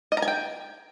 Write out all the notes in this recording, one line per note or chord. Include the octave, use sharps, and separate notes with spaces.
D#5
A#5
G#5
G5